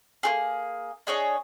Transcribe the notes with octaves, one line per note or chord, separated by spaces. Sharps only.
A#3 G4 G#4
D4 G#4 C#5 D#5